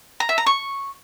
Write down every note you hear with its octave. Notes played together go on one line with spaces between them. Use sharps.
A#5
E5
A#5
C#6